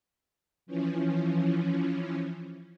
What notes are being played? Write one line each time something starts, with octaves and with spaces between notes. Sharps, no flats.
E3 F3 C#4